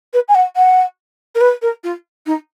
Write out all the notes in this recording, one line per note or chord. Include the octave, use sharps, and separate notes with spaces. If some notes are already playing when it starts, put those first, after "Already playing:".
B4
G#5
F#5
F#5
A#4
B4
A#4
F4
D#4